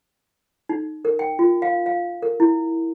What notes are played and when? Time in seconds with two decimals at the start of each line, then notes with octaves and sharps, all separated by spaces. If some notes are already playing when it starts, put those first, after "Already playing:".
0.69 D#4
1.05 A#4
1.19 G5
1.39 F4
1.62 F5
1.86 F5
2.22 A#4
2.40 E4